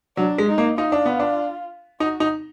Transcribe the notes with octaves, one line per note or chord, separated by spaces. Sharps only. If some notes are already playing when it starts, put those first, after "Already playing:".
F#3 D4
G#3
D#4
A#3
D#4 F4
D4
B3
D4
D#4 F#4
D#4